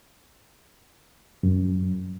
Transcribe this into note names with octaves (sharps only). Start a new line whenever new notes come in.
F#2